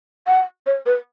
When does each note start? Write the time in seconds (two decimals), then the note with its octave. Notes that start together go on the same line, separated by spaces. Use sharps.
0.27 F#5
0.67 C#5
0.86 B4